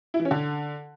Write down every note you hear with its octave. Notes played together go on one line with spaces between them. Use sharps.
E4
E3
C#4
D3